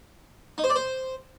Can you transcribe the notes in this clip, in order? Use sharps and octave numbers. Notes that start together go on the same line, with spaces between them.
D#4
C5
D5
C5